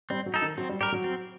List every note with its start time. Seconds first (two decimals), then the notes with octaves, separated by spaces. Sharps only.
0.10 G3 C4
0.26 F#3
0.34 D#4 A4
0.42 D#3
0.58 F#3 C4
0.69 G3
0.81 G3 G4 A#4
0.92 F#3
1.04 C4